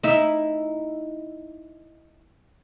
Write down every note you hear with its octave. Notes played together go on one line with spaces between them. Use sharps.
D#4 E4